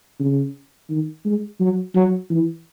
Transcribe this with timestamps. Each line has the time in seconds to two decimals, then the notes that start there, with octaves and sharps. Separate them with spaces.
0.19 C#3
0.90 D#3
1.25 G#3
1.60 F#3
1.95 F#3
2.30 E3